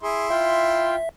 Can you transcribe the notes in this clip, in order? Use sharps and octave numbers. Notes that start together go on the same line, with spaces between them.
E4 G#4 C6
F4 E5 G5